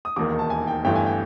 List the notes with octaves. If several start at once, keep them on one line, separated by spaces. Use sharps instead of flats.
D#6
E1 D#2 D#3 D6
A5
G#5
G5
G1 G2 E3 A3 G5
G#5
G5